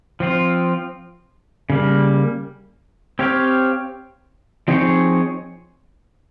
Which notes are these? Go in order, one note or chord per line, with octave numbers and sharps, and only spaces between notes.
F3 C4 F4
C#3 G3 A#3
C4 G4 C#5 F5
F3 C4 D#4 G#4 C#5